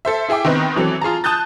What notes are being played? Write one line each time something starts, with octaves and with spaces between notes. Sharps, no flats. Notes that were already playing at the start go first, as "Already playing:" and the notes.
A4 C5 E5
E4 G#4 E5 G5 D6
D#3 B3 C4 D#4 B4
E3 F#3 C4 A4
F4 G#4 A5 A#5
A5 D#6 F#6 G6 A6